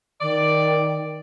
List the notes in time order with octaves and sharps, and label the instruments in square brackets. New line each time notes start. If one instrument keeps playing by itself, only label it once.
[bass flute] D#3 [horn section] D5